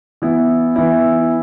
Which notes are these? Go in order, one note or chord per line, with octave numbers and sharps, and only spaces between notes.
E3 B3 E4
E3 B3 E4